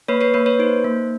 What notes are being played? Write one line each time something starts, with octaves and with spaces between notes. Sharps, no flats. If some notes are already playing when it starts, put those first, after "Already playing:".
A#3 B4 C#5
B4 C#5
A#3 B4 C#5
B4 C#5
D#4 C5
A#3